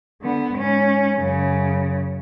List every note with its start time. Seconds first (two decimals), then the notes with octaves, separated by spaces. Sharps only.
0.22 D3 B3
0.55 G#2 C#4
1.15 F#2 C#3